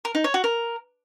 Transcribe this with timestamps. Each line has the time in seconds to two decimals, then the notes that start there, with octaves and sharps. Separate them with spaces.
0.05 A#4
0.15 D#4
0.24 C#5
0.34 F#4
0.44 A#4